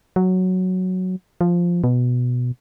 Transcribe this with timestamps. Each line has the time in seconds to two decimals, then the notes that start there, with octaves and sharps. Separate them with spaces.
0.16 F#3
1.41 F3
1.84 B2